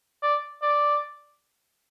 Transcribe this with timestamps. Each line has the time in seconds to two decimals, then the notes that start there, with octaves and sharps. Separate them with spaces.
0.23 D5
0.62 D5